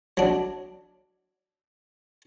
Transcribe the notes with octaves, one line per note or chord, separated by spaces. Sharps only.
F#3 D4